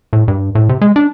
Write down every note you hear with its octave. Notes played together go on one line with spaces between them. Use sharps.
A2
G2
A2
C3
G#3
D4